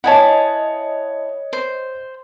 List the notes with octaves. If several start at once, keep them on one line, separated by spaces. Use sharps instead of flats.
E4 C#5 D#5 F#5 G#5 A5
C5